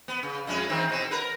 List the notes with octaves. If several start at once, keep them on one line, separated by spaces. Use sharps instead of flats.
B3
C#3
F2 G#3 C#4
D#3 E3 C4
B2 C4
A#4 B4